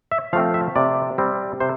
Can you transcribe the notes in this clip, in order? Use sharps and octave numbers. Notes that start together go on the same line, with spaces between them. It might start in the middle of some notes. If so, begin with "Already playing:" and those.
E5
F3 A3 C4 F5
E5
C3 D5
G3 C4
C3 C5